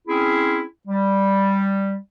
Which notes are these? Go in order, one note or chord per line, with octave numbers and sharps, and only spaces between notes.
C4 C#4 E4 G#4
G3